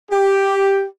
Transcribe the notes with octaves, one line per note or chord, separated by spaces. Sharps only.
G4